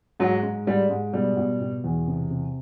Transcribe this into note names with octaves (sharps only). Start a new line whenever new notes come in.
G#2 F#3
G#2
G#2 G3
G#2
B2 G3
B2
B2
E2
C3
C3